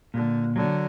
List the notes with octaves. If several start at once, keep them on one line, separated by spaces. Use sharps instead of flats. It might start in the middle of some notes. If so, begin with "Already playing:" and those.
A#2 D3
D3 F#3